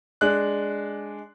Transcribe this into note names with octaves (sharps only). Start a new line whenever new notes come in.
G#3 D4 F#6